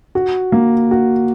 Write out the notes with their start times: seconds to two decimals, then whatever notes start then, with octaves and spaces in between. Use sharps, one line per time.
0.15 F#4
0.52 A#3
0.91 F#4